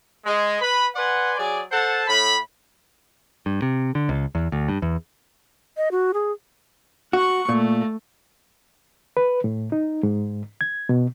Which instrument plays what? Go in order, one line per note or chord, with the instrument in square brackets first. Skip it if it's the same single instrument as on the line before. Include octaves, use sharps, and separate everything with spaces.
[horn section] G#3
B4 B5
B4 D5 F#5 G#5 C6
F#3 G#4 D5
A4 C5 F#5 A5
A2 B5
[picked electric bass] G2
C3
D3
C#2
E2
D2
G2
E2
[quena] D#5
F#4
G#4
[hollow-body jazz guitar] F#4 [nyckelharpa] F#5 C#6
[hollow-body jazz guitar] A#2 [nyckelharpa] A3
[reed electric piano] B4
A2
D#4
G#2
G#6
B2